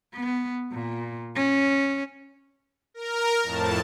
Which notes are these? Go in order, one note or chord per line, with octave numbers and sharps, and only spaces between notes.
B3
A#2
C#4
A#4
F2 A2 A5